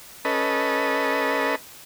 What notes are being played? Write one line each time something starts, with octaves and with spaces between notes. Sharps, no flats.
C#4 A4 B4 D#5